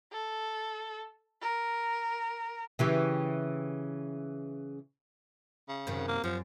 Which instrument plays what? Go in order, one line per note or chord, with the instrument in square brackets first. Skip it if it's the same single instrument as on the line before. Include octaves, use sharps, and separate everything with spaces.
[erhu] A4
A#4
[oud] C#3 E3 G4
[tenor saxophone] C#3
[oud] F#2 C3 D#3
[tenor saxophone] A#3
[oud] F#2 [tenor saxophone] F3